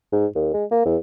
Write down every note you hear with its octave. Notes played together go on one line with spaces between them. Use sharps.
G#2
D#2
G#3
A#3
E2